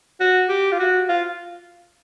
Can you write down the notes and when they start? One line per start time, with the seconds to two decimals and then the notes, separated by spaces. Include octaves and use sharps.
0.20 F#4
0.49 G4
0.72 F4
0.79 F#4
1.09 F4